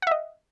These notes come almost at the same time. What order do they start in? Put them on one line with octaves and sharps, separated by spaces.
F#5 E5 D#5